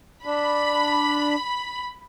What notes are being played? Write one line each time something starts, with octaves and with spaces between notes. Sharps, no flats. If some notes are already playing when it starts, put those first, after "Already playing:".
D4 B5